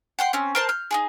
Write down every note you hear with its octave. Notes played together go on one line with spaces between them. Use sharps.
F#5 G5 C6
C4 C#4
A#4 C5 A5
F6 G6
D#4 F#4 G#4